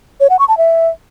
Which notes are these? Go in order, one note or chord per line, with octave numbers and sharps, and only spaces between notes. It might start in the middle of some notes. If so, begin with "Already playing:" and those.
C#5
F#5
C#6
A5
E5